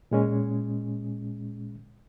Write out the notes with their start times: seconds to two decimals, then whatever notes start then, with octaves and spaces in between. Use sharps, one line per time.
0.11 A#2 G#3 C#4